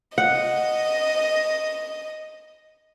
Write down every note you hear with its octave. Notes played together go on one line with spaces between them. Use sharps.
D#5 F#5